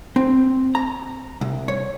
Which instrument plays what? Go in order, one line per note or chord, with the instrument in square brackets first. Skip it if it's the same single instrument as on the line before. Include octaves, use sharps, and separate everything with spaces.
[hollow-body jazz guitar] C4
A#5
C2
C#5